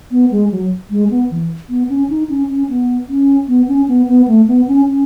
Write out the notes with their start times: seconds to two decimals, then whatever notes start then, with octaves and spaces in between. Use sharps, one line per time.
0.11 B3
0.31 G#3
0.51 F#3
0.91 G#3
1.11 B3
1.31 E3
1.70 B3
1.89 C#4
2.10 D#4
2.29 C#4
2.49 C#4
2.69 B3
3.09 C#4
3.48 B3
3.68 C#4
3.88 B3
4.08 B3
4.28 A3
4.48 B3
4.68 C#4
4.88 C#4